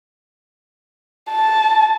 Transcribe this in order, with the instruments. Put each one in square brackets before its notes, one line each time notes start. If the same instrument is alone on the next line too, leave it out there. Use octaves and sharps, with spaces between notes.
[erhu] A5